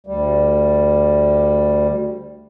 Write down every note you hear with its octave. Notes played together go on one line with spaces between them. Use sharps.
D2 G3